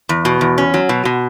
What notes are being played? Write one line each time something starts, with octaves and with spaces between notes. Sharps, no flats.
E2
B2
E2
C#4
F#3
B2
B2